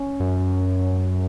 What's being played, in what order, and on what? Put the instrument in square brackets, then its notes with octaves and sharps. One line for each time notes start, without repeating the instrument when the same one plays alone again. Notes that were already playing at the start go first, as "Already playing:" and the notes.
Already playing: [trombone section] C#4
[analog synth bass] F#2